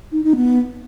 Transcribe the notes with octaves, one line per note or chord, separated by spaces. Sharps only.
D#4
D#4
B3